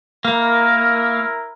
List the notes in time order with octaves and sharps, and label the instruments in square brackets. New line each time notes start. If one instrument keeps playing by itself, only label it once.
[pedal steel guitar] A#3 [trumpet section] E4 A#4